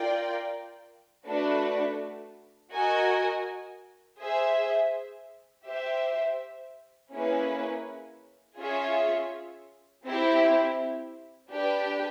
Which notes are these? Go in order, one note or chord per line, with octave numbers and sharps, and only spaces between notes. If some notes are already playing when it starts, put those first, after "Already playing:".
Already playing: F4 A#4 D5 G5
A3 D4 F#4 B4
F#4 A#4 D#5 G#5
G#4 C5 E5
G4 C5 E5
A#3 C#4 E4 G#4 B4
C#4 F4 G#4 C#5 E5
C4 E4 G4
D4 G4 B4